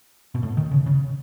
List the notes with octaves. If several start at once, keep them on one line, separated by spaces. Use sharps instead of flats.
B2
A2
D#3
C#3
C#3